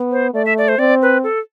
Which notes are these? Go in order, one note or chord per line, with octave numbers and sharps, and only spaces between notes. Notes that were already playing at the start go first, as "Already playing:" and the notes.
Already playing: B3
C5
A3 D5
E5
D5
C5
C4 D5
B4
A4